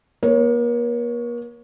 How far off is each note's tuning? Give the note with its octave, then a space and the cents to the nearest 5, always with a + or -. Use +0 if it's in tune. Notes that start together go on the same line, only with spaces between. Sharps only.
A#3 +40 C#5 +0